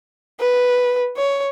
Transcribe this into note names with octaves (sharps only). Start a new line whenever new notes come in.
B4
C#5